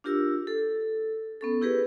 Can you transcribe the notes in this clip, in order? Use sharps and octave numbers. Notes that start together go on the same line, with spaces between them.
D4 F4 G4 A#4 E6
A4
B3 C#4 A4
E4 G4 G#4 A#4 B4